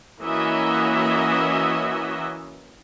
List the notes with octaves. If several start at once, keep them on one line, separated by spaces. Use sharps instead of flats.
E3 A#3 C#4 F#4 D#5 E5